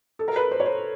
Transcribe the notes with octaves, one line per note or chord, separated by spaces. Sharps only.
A4
A#4
B4
C5
C#5
C5